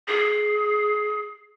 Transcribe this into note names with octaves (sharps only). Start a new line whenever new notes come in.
G#4